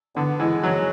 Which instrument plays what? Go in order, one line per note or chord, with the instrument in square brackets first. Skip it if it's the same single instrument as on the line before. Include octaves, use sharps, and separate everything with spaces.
[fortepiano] D3 [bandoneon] B3
[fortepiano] E3 [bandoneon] G#3
[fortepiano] F#3 [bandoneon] F#4